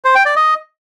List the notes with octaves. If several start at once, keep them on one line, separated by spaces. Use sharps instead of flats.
C5
G5
D5
D#5